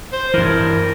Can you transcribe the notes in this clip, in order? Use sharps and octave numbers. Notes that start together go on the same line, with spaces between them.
C5
G2 E3 A#4